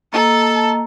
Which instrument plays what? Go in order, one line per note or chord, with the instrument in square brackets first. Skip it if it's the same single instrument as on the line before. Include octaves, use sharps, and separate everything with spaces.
[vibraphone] A#3 D#5 A#5 [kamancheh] A4 A5